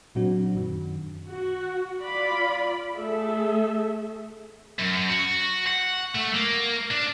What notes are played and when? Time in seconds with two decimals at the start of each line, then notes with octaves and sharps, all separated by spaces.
0.15 A#2 F#3 C4 D4 F#4
0.55 F#2 D#3
1.29 F#4
2.01 F4 D5 B5
2.96 A3 G#4 A4 E5
4.79 F#2
5.10 F#4
5.66 F#5
6.15 A3
6.34 A#3
6.91 D4